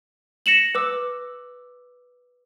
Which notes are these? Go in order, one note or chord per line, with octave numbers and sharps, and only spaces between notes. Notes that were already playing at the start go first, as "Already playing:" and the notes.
A#6 C#7 E7 F#7
B4 D6 E6